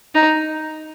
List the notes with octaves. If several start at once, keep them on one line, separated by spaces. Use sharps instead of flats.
D#4